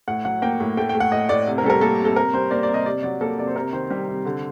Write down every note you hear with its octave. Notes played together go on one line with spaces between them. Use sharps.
A2 F#5
F#3 F#5
A#3 G5
A2
A3 G5
G5
A3
F#5
A2 D#5
A2 D5
C3
A#4
G3 A4
A#4
A#3 A4
C3
A4
C3 A#4
G3 C5
A#3 D5
D5
C3
D#5
C3 D5
F#3 D5
A#3 A4
C3 D5
C5
C3 A#4
D#3 C5
G3
C3
D3